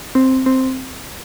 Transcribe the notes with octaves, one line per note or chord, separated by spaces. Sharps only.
C4
C4